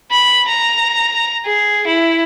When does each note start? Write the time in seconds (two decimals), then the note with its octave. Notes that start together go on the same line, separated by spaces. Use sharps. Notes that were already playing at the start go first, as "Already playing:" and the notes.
0.11 B5
0.48 A#5
1.45 G#4
1.88 E4